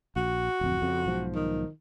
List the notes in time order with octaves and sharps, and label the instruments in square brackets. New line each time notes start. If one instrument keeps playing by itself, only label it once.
[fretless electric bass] A#1 [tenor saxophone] F#4
[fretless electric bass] D1 F2
F2 C#3
B1 G#2 F3
[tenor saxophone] D#3